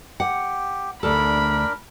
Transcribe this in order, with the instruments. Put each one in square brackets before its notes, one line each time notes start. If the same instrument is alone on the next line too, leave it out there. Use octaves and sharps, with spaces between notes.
[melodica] G4 [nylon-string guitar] F#5
[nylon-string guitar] D2 A4 [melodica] D4 A#4 [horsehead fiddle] B5